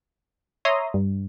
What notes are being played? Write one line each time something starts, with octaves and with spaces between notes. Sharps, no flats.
C#5 E5 A#5 C6 D#6
G2